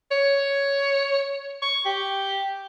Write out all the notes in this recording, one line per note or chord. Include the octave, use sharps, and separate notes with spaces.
C#5
C#6
G4